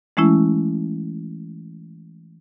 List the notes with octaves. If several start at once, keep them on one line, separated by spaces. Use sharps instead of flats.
E3 G#3 A3 C#4 E4